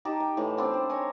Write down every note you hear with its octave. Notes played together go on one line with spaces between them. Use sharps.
D#4 G4 A5
G5
A2 E3
B3 C4 D4
C5
A#4 C#5 G#5